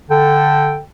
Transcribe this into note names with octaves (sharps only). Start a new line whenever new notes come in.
D3 A4 G5